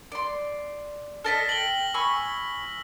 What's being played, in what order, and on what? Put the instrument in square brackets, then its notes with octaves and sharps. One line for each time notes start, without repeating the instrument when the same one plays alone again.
[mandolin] D5 C6
[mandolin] A4 D5 D#5 [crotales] F6 A#6 B6
[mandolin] G5 [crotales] F#7 G7
[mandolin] G#5 B5 C#6 [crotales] E6